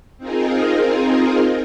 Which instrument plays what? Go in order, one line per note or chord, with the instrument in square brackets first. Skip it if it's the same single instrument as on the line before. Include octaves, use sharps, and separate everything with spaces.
[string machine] C4 D#4 F4 G#4 A#4